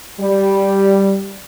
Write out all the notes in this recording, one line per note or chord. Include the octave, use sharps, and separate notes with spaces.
G3